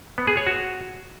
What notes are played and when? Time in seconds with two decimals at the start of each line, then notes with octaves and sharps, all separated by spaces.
0.18 B3
0.27 G#4
0.37 C#5
0.47 F#4